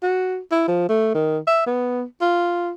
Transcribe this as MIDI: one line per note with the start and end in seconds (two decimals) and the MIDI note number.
0.03 0.39 66
0.52 0.66 64
0.68 0.86 53
0.89 1.10 57
1.14 1.38 51
1.47 1.64 76
1.67 2.04 59
2.21 2.71 65